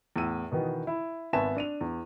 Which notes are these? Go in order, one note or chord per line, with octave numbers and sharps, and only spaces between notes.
E2 A2 E6 D#7
B2 D#3 E3 B3
E4
G#1 B3 E5 G#5 A5 E7
D4 D#7 F7
E2